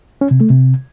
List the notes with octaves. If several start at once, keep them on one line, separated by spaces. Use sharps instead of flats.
C#4
C3
A3
C3